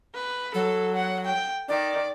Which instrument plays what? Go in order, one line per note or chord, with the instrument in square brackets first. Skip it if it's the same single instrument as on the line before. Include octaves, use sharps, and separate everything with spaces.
[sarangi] B4
[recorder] F#3 [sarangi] A4
[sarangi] F#5
G5
[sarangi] D#3 [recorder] D5